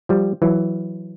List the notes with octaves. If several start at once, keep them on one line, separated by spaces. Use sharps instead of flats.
F3 G3
E3 F#3